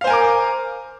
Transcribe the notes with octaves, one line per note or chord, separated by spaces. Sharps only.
A#4 C5 F5 G#5 D6